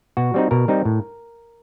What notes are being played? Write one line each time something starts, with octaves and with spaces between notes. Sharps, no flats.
B2 F#4
G3 C4 D#4
B2 A#4
G3 C4 D#4
A2